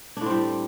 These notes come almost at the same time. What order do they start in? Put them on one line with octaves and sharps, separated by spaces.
D4 A2 C4 G3